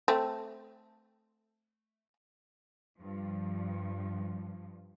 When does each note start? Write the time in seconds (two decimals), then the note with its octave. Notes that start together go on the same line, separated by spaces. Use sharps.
0.08 A3 C4
2.98 G2 F3